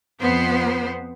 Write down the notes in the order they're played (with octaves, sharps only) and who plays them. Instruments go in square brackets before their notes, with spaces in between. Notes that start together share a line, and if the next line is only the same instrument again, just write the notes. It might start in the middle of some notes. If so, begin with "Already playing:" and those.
[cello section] F2 B3 C5